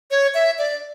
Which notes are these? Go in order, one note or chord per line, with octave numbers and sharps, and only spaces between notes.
C#5
E5
D5